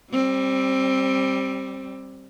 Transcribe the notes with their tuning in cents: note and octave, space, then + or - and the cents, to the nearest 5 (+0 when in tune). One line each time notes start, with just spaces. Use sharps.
G3 +0 C4 +20